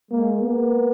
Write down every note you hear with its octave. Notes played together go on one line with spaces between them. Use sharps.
G#3 A#3
A#3 B3